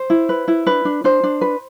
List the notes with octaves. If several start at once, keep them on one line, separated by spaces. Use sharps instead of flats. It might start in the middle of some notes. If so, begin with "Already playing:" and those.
Already playing: C5
E4
B4
E4
D4 B4
D4
D4 C5
D4
B4